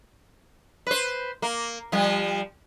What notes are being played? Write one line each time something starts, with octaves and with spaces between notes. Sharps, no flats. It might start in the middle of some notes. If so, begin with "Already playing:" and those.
B4 C5
A#3
F3 G3